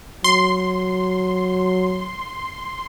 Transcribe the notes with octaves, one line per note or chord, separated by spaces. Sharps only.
F#3 C6